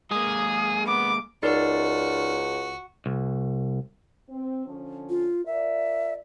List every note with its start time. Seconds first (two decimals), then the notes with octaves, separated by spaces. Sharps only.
0.11 G#3 A#3 G#4 D#6
0.87 B3 D6
1.43 C#2 D#4 F#4 A#4 D5
3.06 C2
4.30 C4
4.66 D3 F3 C#4
5.10 F4
5.46 F4 A#4 D5 E5